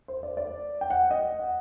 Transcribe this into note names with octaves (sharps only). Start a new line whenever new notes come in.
C5
D5
D5
G5
F#5
D#5
F#5